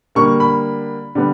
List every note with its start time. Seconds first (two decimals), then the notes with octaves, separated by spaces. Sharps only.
0.15 D3 G3 A#3 C#6
0.40 B5
1.15 D3 G3 B3